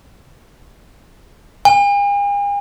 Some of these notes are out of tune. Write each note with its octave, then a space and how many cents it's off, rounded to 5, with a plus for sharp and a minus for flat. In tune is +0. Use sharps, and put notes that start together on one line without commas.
G#5 -45